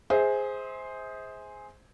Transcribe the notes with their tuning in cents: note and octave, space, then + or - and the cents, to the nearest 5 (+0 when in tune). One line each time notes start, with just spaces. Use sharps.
G#4 +0 C5 +0 E5 -45